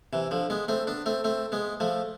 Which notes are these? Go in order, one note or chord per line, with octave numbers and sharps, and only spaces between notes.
C3 E3
D3 F3
G#3 B3
A3 C4
B3 D4
A3 C4
A3 C4
G#3 B3
F3 A3